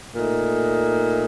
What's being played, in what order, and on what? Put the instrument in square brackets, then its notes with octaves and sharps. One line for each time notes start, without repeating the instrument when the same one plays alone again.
[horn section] A#2 A3 D#4